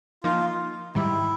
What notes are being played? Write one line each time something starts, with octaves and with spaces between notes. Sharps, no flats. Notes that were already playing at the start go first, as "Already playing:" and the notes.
F3 A#3 D#4 F4
G#2 D#3 G3 E4